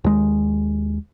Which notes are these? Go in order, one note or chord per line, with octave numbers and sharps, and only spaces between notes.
D#2 G#3